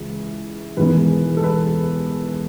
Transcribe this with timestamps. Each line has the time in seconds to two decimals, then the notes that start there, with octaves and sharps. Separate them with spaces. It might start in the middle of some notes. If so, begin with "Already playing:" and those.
Already playing: C#2 C#3 E3
0.77 E1 E2 D#3 G#3 B3 B4
1.37 A4
1.44 B4